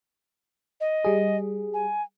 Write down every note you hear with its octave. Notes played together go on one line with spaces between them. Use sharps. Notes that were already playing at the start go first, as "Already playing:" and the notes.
D#5
G3 G#4
G#5